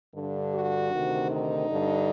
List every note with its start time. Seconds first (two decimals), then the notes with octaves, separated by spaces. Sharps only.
0.15 G2 D3
0.53 F#4
0.92 D2 C3 D#3
1.31 D#4
1.69 G2 D3